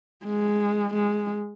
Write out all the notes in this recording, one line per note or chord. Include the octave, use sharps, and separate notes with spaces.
G#3
G#3